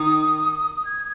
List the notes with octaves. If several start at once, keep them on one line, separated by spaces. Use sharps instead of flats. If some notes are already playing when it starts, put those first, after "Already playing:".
Already playing: D#3 D#4 D#6
G#6